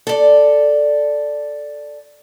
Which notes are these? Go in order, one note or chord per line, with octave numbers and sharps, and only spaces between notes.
A4 D5